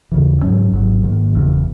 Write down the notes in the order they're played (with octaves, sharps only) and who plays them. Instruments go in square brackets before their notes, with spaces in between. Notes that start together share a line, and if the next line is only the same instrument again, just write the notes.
[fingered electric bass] D#2 C#3 E3
G#2 F#3 C#4
G#1 G#2 F#3
G#2 D#3 A#3
F#1 E2 C#3